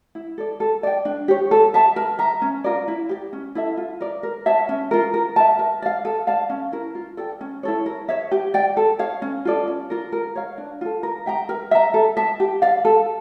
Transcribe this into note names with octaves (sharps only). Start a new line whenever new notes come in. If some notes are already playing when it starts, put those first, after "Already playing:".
E4
A4 D5
A4
D5 G5
D4
G4 C#5
A4
E5 A5
A#4
E5 A#5
C#4
F4 A#4 D5
E4
G4 D5
C#4
E4 A4 E5
F4
A#4 D5
A#4
C#5 E5 A5
C#4
F4 A#4
A#4
E5 A5
A#4
D5 F5
A4
D5 F5 A5
C#4
E4 A#4
F4
A4 D5 G5
C#4
E4 A4 C#5
A#4
C#5 E5
G4
D5 G5
A4
C#5 F5
C#4
F4 A4 D5
C#4
F4 A#4
A#4
C#5 F5
D4
F4 A4
A#4
E5 G5 A#5
A#4
E5 A#5
A4
E5 A5
G4
D5 F5
A4